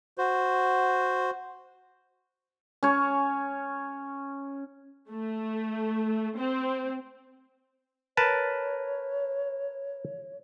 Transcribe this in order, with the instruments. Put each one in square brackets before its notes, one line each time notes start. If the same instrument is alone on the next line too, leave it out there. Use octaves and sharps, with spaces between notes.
[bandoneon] F#4 C5
[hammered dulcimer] C#4 C#5
[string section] A3
C4
[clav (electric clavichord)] A#4 B4 A5 [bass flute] C#5